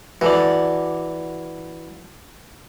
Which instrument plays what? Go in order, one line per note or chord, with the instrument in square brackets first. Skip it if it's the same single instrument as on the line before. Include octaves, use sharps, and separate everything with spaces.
[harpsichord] E3 [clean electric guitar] F#4 A4 D5